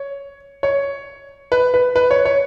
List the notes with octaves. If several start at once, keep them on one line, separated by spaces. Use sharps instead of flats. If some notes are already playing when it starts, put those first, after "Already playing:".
Already playing: C#5
C#5
B4
B4
B4
C#5
C#5